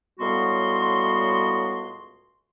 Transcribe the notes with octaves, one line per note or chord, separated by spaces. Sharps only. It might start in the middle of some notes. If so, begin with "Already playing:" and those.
C#2 A2 G3 B3 F#4 C6